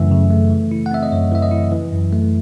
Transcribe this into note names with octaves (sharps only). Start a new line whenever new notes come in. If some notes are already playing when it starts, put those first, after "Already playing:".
Already playing: F#2 C#3 E3 A3 E5
C#3
A3
E3
E4
F#5
C4 E5
D#5
F#2 C#5
E3 E5
D#5
E4
E3
F#2
A3